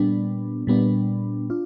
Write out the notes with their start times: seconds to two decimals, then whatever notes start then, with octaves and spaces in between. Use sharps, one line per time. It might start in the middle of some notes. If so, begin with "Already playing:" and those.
Already playing: A#2 G3 B3 D4
0.67 A#2 G3 B3 D4
1.50 D4 F4